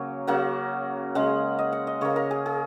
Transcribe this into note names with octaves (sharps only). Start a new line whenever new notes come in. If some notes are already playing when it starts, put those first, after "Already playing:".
Already playing: C#3 F#3 A#3 C#5
C#3 F#3 A#3 F#5
C#3 G#3 F#5
D#5
F#5
D#5
C#3 A#3 C#5
A#4
G#4
G#4